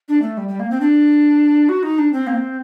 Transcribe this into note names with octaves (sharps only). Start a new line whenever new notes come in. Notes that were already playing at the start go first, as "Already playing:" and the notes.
D4
A3
G3
G3
A#3
C4
D4
F#4
D#4
D4
C4
A#3
C4